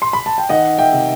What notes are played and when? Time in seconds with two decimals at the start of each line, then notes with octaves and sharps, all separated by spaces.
0.02 C6
0.13 B5
0.26 A5
0.38 G5
0.49 D#3 D#5 F#5
0.78 E5 G5
0.93 C3